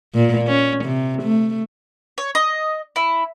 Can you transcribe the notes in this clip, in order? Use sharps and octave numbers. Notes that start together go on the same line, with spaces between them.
A#2
C#4
C3
A3
C#5
D#5
E4